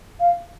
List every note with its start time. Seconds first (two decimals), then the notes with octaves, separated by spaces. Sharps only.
0.20 F5